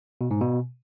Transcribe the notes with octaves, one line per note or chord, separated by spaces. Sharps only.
B2
G#2
B2